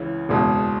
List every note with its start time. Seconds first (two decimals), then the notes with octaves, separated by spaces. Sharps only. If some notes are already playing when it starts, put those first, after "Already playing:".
Already playing: C#2 C#3 E3
0.29 F#1 E2 B2 G#3